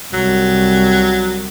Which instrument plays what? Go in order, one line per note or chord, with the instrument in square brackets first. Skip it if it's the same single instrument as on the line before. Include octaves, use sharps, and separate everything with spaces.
[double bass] C2 [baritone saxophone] F#3